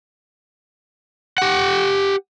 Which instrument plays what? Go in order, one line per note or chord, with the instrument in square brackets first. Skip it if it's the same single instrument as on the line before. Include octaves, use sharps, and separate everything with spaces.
[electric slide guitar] G4 F#5